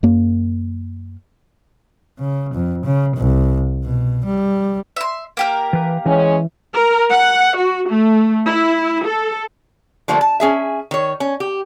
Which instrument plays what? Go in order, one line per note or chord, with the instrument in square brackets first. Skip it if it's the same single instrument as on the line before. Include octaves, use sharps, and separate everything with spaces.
[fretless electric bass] F#2 A#3
[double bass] C#3
F2
C#3
C2
B2
G3
[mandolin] E5 C6
A#3 G4 A#4
[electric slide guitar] E3 B4
[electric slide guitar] E3 [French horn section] G#3 C#4
[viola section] A#4
F#5
F#4
A3
E4
A4
[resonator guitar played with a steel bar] D3 F3 G3 A3 A#3
A5
C#4 G#4 E5
D#3 C#5
C#4
G4